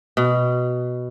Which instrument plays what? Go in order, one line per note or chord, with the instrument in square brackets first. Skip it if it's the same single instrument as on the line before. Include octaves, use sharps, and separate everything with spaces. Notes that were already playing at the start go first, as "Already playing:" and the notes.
[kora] B2